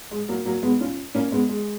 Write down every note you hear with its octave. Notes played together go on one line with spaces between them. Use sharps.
G#3
F#3 A#3
F#3 A#3
G#3 B3
C#4 F4
A#3 C#4
G#3 B3
G#3